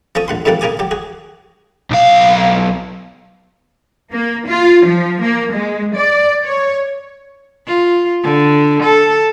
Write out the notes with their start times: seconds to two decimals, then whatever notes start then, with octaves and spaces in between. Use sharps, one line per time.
0.15 F3 C#4 A4 C#6 D#6
0.28 A#1 F#5 C6
0.45 F2 G#2 G3 A#3 A4 F#5
0.61 C#3 A#3 G#4 G#5 D6
0.79 F#3 G4
0.91 F#4 G#4
1.91 B1 F5
4.12 A#3
4.48 F4
4.85 F3
5.21 A#3
5.52 G#3
5.95 D5
6.45 C#5
7.67 F4
8.23 D3
8.82 A4